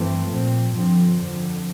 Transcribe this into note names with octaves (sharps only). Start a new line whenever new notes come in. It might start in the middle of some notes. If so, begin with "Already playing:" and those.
Already playing: G2 E3 A3 C4
A#2 F3 C4
G2 D3 F3 C4
F2 D3 F3